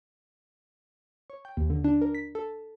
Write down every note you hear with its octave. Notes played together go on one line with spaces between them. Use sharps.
C#5
G5
D#2
D3
D4
A#4
B6
A4